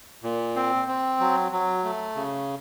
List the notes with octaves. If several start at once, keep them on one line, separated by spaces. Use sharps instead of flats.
A#2
C4
C4
F#3
F#3
A3
C#3